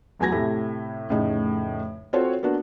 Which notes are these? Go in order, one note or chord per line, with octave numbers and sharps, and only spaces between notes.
F1 E2 F#3 G#5 G#6 A#6
A2 C3 A3 E4 G4
F1 A2 C#3 D#4
C4 F4 F#4 A4 C5 C#5
A#3 B3 D4 F#4